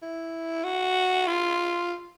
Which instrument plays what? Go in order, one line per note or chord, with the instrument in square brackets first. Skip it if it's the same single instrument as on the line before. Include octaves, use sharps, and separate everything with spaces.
[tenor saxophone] E4
F#4
F4